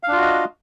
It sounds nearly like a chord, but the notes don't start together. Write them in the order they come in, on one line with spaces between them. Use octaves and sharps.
F5 D4 F4 F#4 D#5